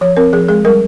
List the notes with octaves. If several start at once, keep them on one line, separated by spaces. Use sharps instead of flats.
F3 C#5
C4 A#4
F3 G#4
G#3 G#4
G3 A#4